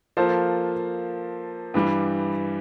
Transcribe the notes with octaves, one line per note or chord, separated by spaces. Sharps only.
F3 A#3 F4 A4 C5
G2 E3 G3